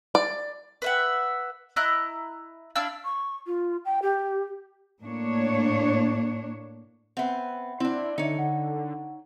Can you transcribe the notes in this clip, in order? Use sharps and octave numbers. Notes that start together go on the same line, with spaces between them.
D5
B4 E5 F#5
E4 D#5 A#5 F#6
D4 E4 F5 E6
C#6
F4
G5
G4
A2 A#3 D4 C#5
B3 C4 E5 F#5
C4 D4 E4
D3 D#4 C#5 E5 C#7
D3 F#5